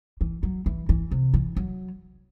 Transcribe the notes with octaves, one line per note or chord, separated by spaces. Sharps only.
E3
F#3
E3
E3
C3
E3
F#3